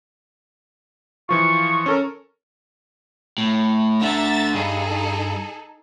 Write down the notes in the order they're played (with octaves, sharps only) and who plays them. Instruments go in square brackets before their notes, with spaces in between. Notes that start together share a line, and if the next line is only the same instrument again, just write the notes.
[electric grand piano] E3 F3 F4 [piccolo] C#6
[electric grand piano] C#4 A4 A#4
[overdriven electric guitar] A2
[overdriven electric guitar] D2 D3 [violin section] E5 A#5 A6
[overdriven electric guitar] G2 [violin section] D#4 G#4 A4